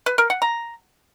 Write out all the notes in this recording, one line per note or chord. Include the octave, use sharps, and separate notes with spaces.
B4
A#4
F#5
A#5